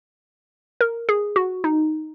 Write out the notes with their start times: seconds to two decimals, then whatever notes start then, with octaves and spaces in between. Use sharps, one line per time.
0.81 A#4
1.09 G#4
1.36 F#4
1.64 D#4